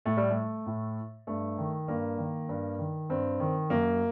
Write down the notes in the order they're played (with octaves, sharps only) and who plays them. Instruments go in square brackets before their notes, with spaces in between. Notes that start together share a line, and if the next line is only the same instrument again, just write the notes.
[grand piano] A2 A3
G3
A3
A2
G2 A3
D#3
G2 A#3
D#3
G2
D#3
G2 C4
D#3
F#2 A#3